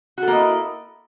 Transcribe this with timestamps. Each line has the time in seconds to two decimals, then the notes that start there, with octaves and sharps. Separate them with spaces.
0.18 F#4
0.23 A4
0.28 A#3
0.33 D#5
0.38 E4